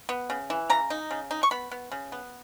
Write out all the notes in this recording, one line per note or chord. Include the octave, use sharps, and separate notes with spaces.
B3
C#3
E3
C#3 A#5
D#4
C#3
D#4
C#6
B3 B5
B3
C#3
B3